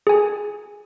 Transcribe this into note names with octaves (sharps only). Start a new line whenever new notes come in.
G#4 G#5